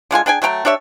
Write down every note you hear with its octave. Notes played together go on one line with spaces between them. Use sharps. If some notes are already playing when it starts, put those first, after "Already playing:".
D3 G#3 F4 G#5
D4 G#4 G5 G#5
F#3 A3 G5 A#5
D4 G4 C#5 E5